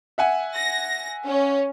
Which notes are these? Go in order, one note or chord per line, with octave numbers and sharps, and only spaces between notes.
E5 F#5 G#5
A#6
C#4